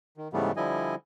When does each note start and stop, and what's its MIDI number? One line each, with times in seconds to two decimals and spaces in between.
0.17 0.28 51
0.33 0.52 44
0.33 0.52 49
0.33 0.52 52
0.33 0.52 55
0.33 0.52 57
0.33 0.52 59
0.56 0.95 50
0.56 0.95 53
0.56 0.95 55
0.56 0.95 64
0.56 0.95 75
0.56 0.95 80